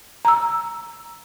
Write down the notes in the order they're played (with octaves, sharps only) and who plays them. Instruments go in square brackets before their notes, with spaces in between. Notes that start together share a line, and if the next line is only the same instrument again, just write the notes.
[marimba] A#5 E6